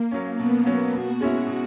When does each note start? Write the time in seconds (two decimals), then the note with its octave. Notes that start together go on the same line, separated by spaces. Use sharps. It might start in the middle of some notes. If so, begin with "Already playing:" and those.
Already playing: A#3
0.11 F#3 C#4
0.39 B2 B3
0.66 F#3 C#4
0.93 B2 F#4
1.20 G#3 C#4 E4
1.47 B2